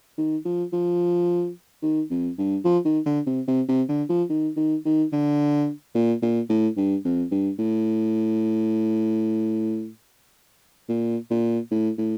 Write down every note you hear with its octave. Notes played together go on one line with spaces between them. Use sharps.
D#3
F3
F3
D#3
F2
G2
F3
D#3
D3
C3
C3
C3
D3
F3
D#3
D#3
D#3
D3
A#2
A#2
A2
G2
F2
G2
A2
A#2
A#2
A2
A2